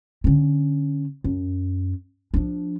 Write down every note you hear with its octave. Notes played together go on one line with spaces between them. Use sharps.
D3 C#4
F#2
F3 D4